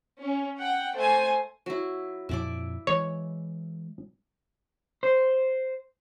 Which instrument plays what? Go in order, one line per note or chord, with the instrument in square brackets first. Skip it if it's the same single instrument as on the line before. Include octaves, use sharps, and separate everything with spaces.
[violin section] C#4
F#5 G5
A3 C5 G#5
[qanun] F#3 E4
[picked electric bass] F2 A#2 F3 [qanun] E4 D5 D6
[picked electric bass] E3 G#3 [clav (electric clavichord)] C#5
[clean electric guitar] C5